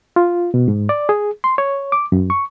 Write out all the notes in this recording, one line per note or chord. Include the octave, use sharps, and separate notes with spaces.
F4
B2
G#2
D5
G#4
C6
C#5
D6
F#2
C#6